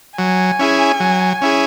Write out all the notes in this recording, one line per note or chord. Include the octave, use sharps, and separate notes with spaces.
F#3 G#5
C#4 E4 G#4
F#3
C#4 E4 G#4